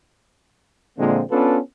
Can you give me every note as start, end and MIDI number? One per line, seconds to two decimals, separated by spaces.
0.99 1.22 46
0.99 1.22 50
0.99 1.22 53
0.99 1.22 56
0.99 1.22 58
0.99 1.22 60
1.31 1.59 59
1.31 1.59 61
1.31 1.59 62
1.31 1.59 65
1.31 1.59 69
1.31 1.59 71